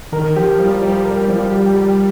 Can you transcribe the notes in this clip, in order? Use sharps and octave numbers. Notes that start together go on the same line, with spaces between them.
D#3 A#4
F3 G4
F3 G3
F3 G3
A#4
F3
G4
G4